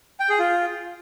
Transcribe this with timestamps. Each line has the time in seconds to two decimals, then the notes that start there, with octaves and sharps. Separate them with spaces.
0.20 G5
0.30 G#4
0.39 F4